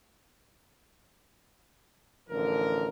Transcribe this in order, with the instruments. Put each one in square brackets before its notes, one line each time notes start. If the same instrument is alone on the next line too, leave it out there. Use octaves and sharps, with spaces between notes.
[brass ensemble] A1 D3 F3 A#4